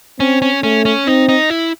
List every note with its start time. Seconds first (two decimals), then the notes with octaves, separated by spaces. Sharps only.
0.20 C4 C#4
0.42 C#4
0.63 A3 C#4
0.85 C#4
1.06 C4 D#4
1.29 D#4
1.50 E4